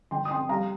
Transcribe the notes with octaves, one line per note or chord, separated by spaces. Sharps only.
G1 G5 C6
D#6
C4 G5 C6
G3 F5 A#5